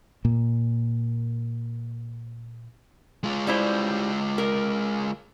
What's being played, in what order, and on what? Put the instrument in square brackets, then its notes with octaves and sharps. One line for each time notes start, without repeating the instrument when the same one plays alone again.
[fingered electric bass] A#2 A#3
[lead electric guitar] G#3 F4
[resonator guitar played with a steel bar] G3 E4 C5
A#4